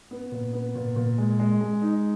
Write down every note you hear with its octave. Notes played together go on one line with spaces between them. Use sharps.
B3
A#2
B3
A#2
A#2
G#3
G#3
G#3
D#4